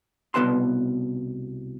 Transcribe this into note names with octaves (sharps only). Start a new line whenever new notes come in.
C2 B2 C#4 B4 A5 C6